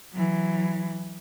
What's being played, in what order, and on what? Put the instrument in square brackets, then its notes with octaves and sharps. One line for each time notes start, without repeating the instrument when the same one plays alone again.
[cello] E3 F#3